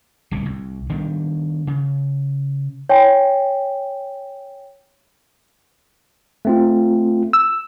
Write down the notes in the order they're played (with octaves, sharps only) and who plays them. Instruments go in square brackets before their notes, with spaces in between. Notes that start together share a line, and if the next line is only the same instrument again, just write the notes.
[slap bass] D1 C2 B2
C2
D#3 G3 B3 D4
C#3
[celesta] C#5 G5 G#5
[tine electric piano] A3 C4 F4
[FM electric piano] E6